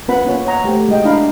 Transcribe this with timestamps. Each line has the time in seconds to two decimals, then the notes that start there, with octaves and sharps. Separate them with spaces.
0.08 B3 C#4 F4 B4 F#5 B5
0.25 A#3 C#4 F4 C#5
0.46 C#5 F#5 A#5
0.64 A3 G4 C5 G5
0.88 G#3 F#4 D#5 G5
1.04 D4 E4 F5 A#5 B5